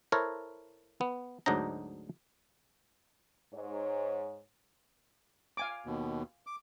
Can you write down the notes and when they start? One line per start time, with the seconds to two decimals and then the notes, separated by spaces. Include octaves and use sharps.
0.12 E4 A4 A#4 C5 C#5
1.01 B3
1.46 D2 G#2 F#3 D4 D#4 A#5
3.53 G#2 C#5
5.57 F5 G#5 D6
5.86 D#2 B2
6.47 D6